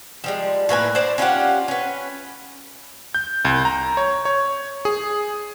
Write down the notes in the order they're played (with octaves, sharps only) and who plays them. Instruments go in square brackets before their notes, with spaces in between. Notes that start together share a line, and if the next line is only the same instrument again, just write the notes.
[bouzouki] F3 G3 G#3
A2 A#3 B4 G#5
D4 C5 D5
C#4 F4 G4 F#5
C#4 B4
[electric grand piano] G6
C2
A#5
C#5
C#5
G#4